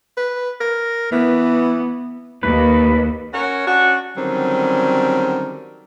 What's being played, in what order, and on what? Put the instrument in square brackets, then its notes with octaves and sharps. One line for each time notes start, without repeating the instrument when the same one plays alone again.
[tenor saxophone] B4
A#4
[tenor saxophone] E3 [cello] B3
[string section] D#2 [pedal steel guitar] B4
[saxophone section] C#4 F#4 A#4 C#5
C#4 D4 F#4
D3 D#3 F#3 G3 C4 C#4